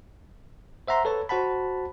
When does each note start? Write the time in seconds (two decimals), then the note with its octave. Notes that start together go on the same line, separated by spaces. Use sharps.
0.88 C5 E5 F#5 A#5 C6
1.05 A4 B4 C#5 A5
1.29 F#4 C5 F#5 A5 B5